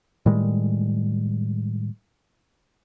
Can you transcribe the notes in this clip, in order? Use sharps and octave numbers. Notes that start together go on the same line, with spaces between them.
A2 D#3 G3 G#3